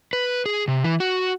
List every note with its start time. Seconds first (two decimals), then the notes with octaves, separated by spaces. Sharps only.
0.13 B4
0.46 G#4
0.68 C3
0.84 E3
1.00 F#4